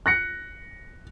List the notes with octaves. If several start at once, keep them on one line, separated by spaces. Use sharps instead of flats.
F#6 A#6 C#7